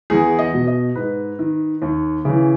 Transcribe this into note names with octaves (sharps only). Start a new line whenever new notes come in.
E2 G#4
D#5
B2
D#5
G#2 B4
D#3
D#2
C#3 E3